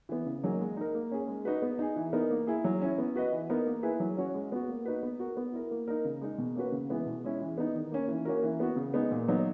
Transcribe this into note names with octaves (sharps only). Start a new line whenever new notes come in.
E3 B3
C#3
F#3 A#3 D#4 G#4
G#3
D#4 A#4
A#3
C#4 G#4
G#3
D#4 F#4 B4
B3
D#4 G#4
E3
B3 D#4 A#4
A#3
E4 G#4
F#3
C#4 E4
B3
F#4 B4 D#5
E3
B3 D#4 A#4
A#3
E4 G#4 B4
F#3
C#4 F#4 C#5
G#3
B3 F#4
A#3
D#4 F#4 B4
B3
F#4 A#4
B3
E4 A#4
A#3
D#4 A#4
C#3
G#3 D#4
B2
A#3 C#4 F#4 B4
C#3
E3 G#3 B3
B2
G#3 C#4 E4
E3
B3 D#4
D#3
A#3 C#4
E3
A#3 C#4 F#4 A#4
E3
B3 F#4
C#3
G#3 B3 D#4
A#2
F#3 B3 D#4